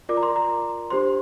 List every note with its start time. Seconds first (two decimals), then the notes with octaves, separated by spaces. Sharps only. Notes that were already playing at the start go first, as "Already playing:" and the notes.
0.09 F4 A#4 D5 D6
0.17 A#5
0.23 C6
0.36 A#5
0.90 D4 G4 C5 C6